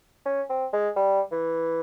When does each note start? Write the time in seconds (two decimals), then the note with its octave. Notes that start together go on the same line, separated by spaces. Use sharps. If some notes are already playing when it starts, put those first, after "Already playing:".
0.26 C#4
0.50 C4
0.73 G#3
0.96 G3
1.32 E3